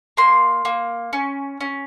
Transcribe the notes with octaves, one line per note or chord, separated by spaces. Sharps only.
A#3 C6
A#3
C#4
C#4